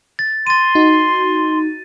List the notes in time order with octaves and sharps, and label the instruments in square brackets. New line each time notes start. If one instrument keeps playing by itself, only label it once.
[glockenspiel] A6
[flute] C6 [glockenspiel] A6 D#7
[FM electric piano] D#4 F#4